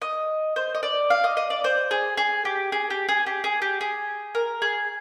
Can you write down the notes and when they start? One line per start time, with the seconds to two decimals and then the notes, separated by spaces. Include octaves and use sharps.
0.02 D#5
0.56 C5
0.75 D#5
0.83 D5
1.10 F5
1.24 D#5
1.37 D#5
1.50 D5
1.64 C5
1.91 G#4
2.17 G#4
2.45 G4
2.72 G#4
2.90 G4
3.08 G#4
3.26 G4
3.44 G#4
3.62 G4
3.81 G#4
4.35 A#4
4.62 G#4